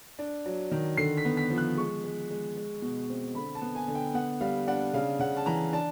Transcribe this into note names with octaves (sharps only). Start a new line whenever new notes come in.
D4
F#3
D#3
D3 C7
B6
B3
B6
F3
F#6
G#3 C#6
G#3
G#3
G#3
B2
C4
D3 B5
A5
B3
G#5
D3
G5
B3 F#5
G3 F5
D4 F#5
C#3 F5
C#3 F#5
A5
E3 A#5
D4 A5